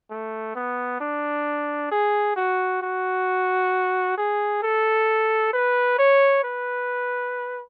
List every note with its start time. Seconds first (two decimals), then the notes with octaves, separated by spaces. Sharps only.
0.11 A3
0.56 B3
1.01 D4
1.92 G#4
2.36 F#4
2.82 F#4
4.18 G#4
4.63 A4
5.53 B4
5.99 C#5
6.44 B4